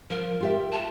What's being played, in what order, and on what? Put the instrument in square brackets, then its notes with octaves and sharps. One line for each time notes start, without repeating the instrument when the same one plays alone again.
[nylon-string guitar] F3 [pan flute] A#4
[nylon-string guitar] F4 G4 E5
[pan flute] A5